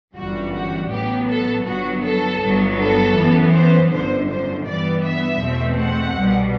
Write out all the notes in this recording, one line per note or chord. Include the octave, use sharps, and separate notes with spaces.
G1 F#2 E3 G3 F#4
F#4
A1 A2 F#3 B3 G4
A4
G1 G2 F#3 B3 F#4
A4
G1 G2 F#3 B3
A4
F#2 E3 B3
C5
G1 F#2 D3 C5
C5
G2 E3 G3 B3 D5
E5
E2 B2 A3 C4
F#5
C2 B2 G3